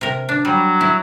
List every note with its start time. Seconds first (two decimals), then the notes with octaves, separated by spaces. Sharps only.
0.01 C3 A#4
0.29 D4
0.45 F#3 G3
0.81 E4